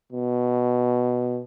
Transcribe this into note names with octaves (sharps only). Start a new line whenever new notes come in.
B2